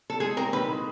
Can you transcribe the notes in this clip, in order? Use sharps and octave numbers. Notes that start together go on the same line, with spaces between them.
A4
G#3 G#4
C4 A#4
D#3 B4
G#3